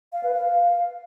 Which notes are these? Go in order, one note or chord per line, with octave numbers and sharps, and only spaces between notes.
F5
B4
F5